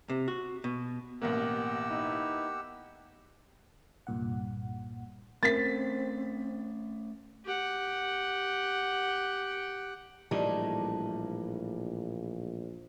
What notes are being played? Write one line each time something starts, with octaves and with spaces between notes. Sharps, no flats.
C3
F#4
B2
A1 B2 A#3 G4 A#4 F#5 E6
B3 D#4 E4
C2 G2 A#2 F#5
A3 C4 C#4 A#4 A6 B6
G4 F#5
A#1 A2 E3 G3 A3 D4 D#4